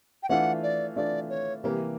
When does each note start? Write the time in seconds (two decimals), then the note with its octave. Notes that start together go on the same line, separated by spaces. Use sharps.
0.23 G5
0.29 E3 A3 D4 F4 F#5
0.63 D5
0.96 E3 A3 D4 F4 D5
1.30 C#5
1.63 C3 E3 G3 A#3 G4